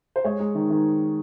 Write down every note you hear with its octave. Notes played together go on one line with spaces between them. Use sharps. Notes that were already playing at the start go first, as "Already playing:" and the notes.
C5
G#3 C#5
G#3
D#3
D#3